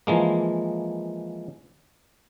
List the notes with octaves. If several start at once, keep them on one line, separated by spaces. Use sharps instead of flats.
E3 F3 G#3 A#3